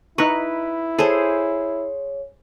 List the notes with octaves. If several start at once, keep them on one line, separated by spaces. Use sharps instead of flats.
D#4 E4 B4 A#5 C#6
G#4 A4 C5 C#5